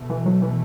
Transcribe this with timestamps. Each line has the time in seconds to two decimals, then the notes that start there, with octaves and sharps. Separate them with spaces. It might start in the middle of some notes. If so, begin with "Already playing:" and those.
Already playing: E2 B2 A3
0.10 E3
0.26 F#3
0.42 E3